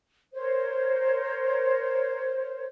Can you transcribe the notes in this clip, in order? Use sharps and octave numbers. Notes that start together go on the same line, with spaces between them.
A#4 C5 C#5